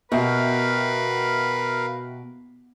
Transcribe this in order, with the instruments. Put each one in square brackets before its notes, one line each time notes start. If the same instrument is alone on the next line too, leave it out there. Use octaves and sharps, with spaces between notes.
[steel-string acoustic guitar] B2 [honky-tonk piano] F#4 G4 E5 [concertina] A#4 F5 [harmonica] B4